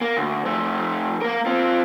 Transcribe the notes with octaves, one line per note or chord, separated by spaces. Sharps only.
A#3
D2
F2 A3
A#3 A#4
C4 F4